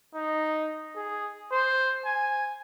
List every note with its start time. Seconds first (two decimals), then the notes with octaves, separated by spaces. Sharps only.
0.15 D#4
0.96 G#4
1.52 C5
2.05 G#5